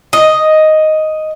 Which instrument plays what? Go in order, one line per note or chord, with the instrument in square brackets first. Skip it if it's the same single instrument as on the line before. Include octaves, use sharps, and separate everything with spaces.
[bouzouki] D#5